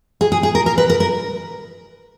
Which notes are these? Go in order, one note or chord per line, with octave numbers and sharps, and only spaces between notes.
G#4
G#4
G#4
A#4
A#4
B4
A#4
A#4